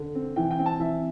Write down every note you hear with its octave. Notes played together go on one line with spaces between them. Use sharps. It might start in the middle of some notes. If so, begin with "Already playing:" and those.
Already playing: D3
C4
E3 G5
G5
C4
A5
E3 E5